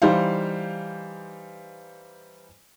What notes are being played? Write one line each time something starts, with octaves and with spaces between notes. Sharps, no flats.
E3 G3 D#4 C5 F5